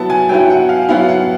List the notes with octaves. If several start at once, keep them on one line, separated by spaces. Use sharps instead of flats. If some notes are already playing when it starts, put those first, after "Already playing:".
Already playing: F#3 B3 E4 A5
G#5
F#3 B3 E4 G5
F#5
F5
F#3 B3 E4 F5
F#5